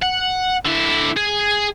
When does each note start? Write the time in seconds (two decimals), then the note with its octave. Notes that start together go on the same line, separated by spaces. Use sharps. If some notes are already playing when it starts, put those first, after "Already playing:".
0.02 F#5
0.65 D3 E4
1.17 G#4